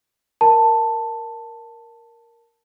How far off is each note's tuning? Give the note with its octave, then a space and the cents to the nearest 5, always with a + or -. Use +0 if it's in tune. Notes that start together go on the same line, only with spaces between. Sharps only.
A#4 +0 A5 +10